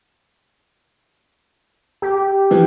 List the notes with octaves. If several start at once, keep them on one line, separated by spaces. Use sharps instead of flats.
G4
E3 F3